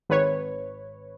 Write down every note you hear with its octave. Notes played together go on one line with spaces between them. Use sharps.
G#1 B4 C#5